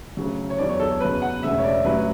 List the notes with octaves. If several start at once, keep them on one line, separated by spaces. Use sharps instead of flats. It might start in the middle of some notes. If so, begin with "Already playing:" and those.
D2 C#3 F#3
C#5
E2 D3 F#3 D5
C#5
A4
C#5
F#1 E2 C#3 F#3 B4
F#5
E1 D2 C#3 E5
C#5
D5
A1 A2 F#3 B4